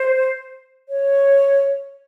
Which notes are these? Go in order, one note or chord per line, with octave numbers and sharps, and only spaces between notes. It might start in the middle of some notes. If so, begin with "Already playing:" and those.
Already playing: C5
C#5